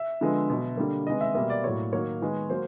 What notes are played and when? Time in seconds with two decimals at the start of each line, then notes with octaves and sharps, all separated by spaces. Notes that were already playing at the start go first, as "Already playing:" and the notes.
Already playing: E5
0.21 D3 F3 G#3 B3
0.50 B2 F#3 B3
0.77 D3 G3 A#3
1.07 C3 D#3 G#3 B3 D#5
1.21 E5
1.35 B2 G3 A#3 E5
1.50 D5
1.64 A2 F#3 A#3 C#5
1.93 D#3 F#3 A#3 C#5
2.22 D#3 G#3 B3
2.50 F#3 A#3 C5